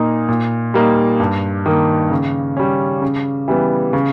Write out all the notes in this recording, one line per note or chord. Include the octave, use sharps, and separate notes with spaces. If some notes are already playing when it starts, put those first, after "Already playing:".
Already playing: A#2 A#3 D#4
A#2
G3 A#3 D#4
G2
D#3 A#3
C#3
G3 C#4
C#3
E3 G3 B3
C#3